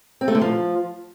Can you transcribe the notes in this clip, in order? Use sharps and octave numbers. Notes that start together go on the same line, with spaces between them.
C4
A3
D3
F3